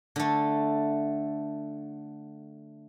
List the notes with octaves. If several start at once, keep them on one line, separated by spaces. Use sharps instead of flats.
D3 A3